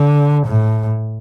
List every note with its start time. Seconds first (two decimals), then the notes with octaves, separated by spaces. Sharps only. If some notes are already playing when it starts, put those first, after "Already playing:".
Already playing: D3
0.46 A2